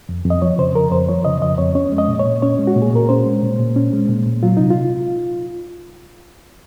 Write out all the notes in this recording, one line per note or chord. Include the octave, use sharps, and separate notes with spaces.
F2
F2
D#5
F3 C#5
C#3 C5
F2 A#4
F2 C5
F3 C#5
C#3 D#5
F2 D#5
F2 C#5
C#4 C#5
G#3
D#5
A#2
C#5
A#2
C#4 C#5
G#3
F#4
A#2
G#4
A#2 A#4
C#4 C5
G#3
A#2
A#2
C#4
G#3
A#2
A#2
F#3 F4
C3 D#4
F4